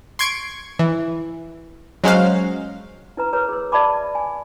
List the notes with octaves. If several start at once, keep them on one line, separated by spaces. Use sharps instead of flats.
C6 C#6 G#6 D7
E3
F#3 G#3 C#4 F#4 C5 F5
E4 B4 A#5
G#4 A#4 B4 C#5 A#5
G#4 E6
G#4 D5 E5 A5 B5 D6
G#5